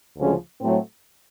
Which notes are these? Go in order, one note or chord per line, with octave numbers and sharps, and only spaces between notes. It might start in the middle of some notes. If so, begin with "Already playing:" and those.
D2 C#3 F3 G#3 C#4
A2 F#3 A3 C4